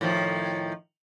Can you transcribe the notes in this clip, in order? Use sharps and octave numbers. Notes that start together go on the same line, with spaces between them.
A2 D#3 F3